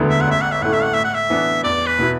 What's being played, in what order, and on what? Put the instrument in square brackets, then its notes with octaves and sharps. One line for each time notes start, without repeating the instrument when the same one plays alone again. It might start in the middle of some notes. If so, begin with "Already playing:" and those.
Already playing: [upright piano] E1 D2 D3 B3 E4
[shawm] E5
F#5
[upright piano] A1 [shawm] E5
[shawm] F#5
E5
[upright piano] A2 A3 E4 [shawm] F#5
[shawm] E5
F#5
[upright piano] A2 [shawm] E5
[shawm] F#5
E5
[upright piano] E3 B3 D4
[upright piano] E2 [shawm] D5
[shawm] B4
[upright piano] B2 B3 E4